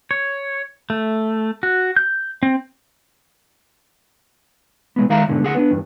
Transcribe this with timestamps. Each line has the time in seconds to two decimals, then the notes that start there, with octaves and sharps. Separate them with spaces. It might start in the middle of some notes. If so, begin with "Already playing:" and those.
0.11 C#5
0.90 A3
1.63 F#4
1.96 G6
2.43 C4
4.96 B2 G#3 B3
5.09 D#3 G#3 E5 F5 A#5
5.29 G#2 B2 D3 G#3
5.43 D2 G#4 F#5
5.55 B3 D4
5.71 E2 G2